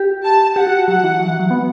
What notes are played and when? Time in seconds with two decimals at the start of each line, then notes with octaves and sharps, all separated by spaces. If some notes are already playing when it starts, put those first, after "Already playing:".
Already playing: G4
0.24 A5
0.56 G4 F#5
0.67 F#4
0.87 F#3 F#5
1.04 E3
1.19 F#3
1.29 E3
1.40 F#3
1.51 B3